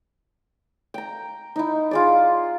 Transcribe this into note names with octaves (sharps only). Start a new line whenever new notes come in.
G5 A#5
D#4 E4
F4 G#4 D5